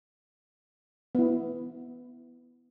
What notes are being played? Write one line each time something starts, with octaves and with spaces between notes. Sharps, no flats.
B3 E4